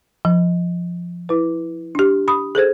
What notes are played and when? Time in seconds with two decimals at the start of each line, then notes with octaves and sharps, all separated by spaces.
0.25 F3
1.29 E4 B4
1.95 D4 G4
2.28 B5 D#6
2.55 G#4 A4 C5 G#6